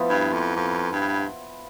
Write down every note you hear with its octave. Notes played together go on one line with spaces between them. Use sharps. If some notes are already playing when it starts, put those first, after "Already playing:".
Already playing: F3 B3 E4
G2
F2
F2
G2